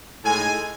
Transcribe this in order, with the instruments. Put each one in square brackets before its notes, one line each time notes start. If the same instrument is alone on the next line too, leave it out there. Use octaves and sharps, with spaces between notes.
[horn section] A2 G#3 D#4 G#5